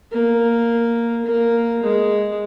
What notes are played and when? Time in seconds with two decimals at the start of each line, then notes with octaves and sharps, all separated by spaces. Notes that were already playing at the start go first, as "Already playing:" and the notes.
0.12 A#3
1.26 A#3
1.83 G#3